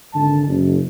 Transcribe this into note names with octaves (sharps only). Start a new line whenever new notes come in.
G#1 D3 A5
F#1